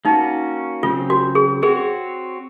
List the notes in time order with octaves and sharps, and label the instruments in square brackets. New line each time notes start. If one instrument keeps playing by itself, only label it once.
[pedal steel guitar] A#3 C#4 F#4 [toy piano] D#4
[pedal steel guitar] C#3 F#3 C4 [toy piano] F4
[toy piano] F#4
G#4
[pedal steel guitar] C4 F#4 C#5 [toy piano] G#4